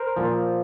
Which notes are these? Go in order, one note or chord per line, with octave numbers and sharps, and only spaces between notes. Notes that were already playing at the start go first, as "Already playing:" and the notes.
Already playing: A#4 C5
A#2 F3